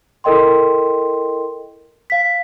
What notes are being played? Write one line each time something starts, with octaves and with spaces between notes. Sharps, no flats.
E4 A4 A#4 D#5 G5 C6
F5 B6